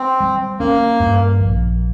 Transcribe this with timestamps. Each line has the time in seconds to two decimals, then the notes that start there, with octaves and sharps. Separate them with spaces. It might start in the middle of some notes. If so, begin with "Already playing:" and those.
Already playing: C4
0.20 G3
0.60 A#3 C#4
1.00 G2
1.40 A#1